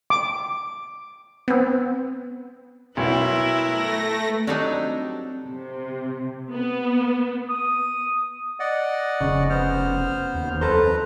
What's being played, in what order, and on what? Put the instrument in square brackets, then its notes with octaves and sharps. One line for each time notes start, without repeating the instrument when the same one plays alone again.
[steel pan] D6
[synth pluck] B3 C4
[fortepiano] B1 B2 [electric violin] E4 [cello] A#4 B4
[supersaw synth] A3 A#6
[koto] F#3 G3 D#4 [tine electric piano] C4 [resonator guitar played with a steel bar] D4 G4 A4
[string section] C3
B3
[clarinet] D#6
[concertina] D5 D#5 F#5
[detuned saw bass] F1 [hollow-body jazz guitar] C#3
[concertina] B3 C5 F6
[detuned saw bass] D#2
[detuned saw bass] F2 [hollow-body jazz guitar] A4 C5 [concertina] B4 A#5